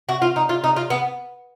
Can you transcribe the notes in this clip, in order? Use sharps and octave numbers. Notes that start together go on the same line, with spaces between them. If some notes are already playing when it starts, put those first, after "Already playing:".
F#4
F4
D#4
F4
D#4
F4
B3